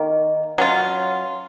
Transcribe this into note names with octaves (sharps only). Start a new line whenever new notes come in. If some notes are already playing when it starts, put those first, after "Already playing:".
Already playing: D#3 A#3
F#3 C#4 F4